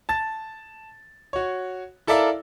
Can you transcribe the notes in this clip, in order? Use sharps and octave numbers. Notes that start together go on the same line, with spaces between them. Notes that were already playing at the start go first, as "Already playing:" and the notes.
A5 A6
F#4 C#5
E4 A4 A#4 D5 E5 F5